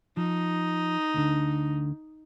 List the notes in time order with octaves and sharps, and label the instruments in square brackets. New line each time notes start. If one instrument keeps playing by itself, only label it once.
[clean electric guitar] F3 [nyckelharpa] D#4
[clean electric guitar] D2 D3